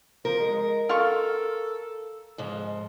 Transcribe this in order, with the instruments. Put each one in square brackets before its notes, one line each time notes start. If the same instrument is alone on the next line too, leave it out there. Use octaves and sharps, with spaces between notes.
[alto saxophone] F3 [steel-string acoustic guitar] A#4
[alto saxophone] G#3
[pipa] F4 F5 C#6 [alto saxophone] A4
[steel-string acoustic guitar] G#2 F3 [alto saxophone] D#5